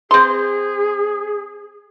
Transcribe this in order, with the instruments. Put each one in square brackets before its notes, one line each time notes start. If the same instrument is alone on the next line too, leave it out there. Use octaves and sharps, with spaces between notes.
[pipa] C4 C6 [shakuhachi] G#4